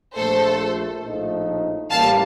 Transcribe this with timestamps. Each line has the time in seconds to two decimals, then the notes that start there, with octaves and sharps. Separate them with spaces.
0.15 A#1 A#2 A3 A4 C5
1.03 A#1 A2 F3 A3 D#4
1.90 A1 A2 G3 A#3 F5 A5